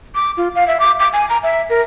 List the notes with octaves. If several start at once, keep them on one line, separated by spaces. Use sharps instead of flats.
D6
F4
F5
E5
D6
D6
G#5
A#5
E5
A#4